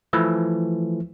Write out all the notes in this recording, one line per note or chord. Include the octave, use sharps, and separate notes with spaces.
E3 F3 A3